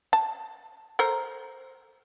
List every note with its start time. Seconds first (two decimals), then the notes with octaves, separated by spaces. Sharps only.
0.13 A5
0.99 A4 A#4 C5